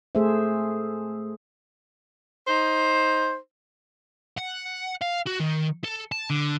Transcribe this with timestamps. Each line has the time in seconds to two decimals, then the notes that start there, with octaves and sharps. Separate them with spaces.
0.15 A3 G#4 A4 C5 E5
2.48 D#4 C5
4.38 F#5
5.02 F5
5.27 F#4
5.40 D#3
5.84 A4
6.12 A5
6.30 D3